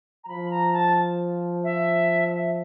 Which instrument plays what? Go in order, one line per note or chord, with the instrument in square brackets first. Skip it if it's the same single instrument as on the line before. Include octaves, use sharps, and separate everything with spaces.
[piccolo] A#5
[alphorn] F3 [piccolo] B5
[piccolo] A#5
A5
E5
E5